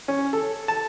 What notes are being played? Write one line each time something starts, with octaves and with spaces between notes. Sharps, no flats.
C#4
A4
A5